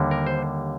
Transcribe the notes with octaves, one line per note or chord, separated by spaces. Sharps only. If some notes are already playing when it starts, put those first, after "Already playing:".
Already playing: D#2 D3 G3 A#3
A#4
C5